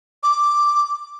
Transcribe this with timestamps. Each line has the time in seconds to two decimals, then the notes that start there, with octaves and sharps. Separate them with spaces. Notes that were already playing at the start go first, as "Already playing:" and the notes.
0.23 D6